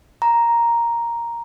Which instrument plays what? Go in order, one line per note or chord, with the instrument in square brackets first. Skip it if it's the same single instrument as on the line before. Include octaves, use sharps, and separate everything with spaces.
[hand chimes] A#5